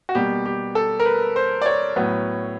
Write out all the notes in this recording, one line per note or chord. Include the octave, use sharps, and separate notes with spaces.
F#4
B2 G3 A#3 G4
G4
A4
A#4
B4
C5
D5
C#5
A2 F#3 B3